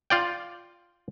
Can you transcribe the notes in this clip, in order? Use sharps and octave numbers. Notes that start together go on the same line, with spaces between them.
F4 D5 G5